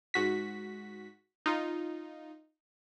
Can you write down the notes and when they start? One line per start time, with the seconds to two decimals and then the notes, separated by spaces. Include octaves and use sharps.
0.14 G#2 F#4 B6
1.46 D#4 F4